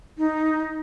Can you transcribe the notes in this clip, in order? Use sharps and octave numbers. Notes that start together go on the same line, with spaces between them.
D#4